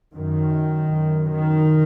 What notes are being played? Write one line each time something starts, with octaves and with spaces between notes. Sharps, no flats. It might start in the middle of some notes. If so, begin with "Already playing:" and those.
F#2 D#3
F#2
D#3